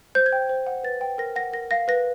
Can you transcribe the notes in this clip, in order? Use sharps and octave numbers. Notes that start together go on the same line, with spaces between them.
C5 G6
G#6
G5
C5
F#5
B4 A6
G5
A#4 A#6
F#5 A#6
A#4 A#6
F5 A#6
B4 A#6